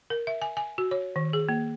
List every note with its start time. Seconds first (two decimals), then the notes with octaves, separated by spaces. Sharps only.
0.10 A#4
0.27 E5
0.42 G#5
0.57 G#5
0.78 F#4
0.91 C#5
1.16 D#3
1.33 G#4
1.49 A#3